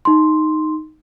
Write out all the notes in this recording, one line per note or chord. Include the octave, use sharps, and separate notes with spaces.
D#4 C6